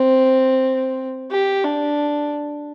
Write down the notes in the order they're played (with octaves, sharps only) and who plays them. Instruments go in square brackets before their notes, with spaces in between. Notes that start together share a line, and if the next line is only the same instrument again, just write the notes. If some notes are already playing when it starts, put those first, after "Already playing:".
Already playing: [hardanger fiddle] C4
G4
D4